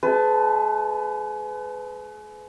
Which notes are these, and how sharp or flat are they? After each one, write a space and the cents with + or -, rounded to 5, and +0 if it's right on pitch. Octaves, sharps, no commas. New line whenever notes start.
G#3 +35 B4 +30 A5 +0